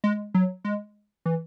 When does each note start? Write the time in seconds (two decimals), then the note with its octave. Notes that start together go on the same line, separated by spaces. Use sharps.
0.04 G#3
0.35 F#3
0.65 G#3
1.26 E3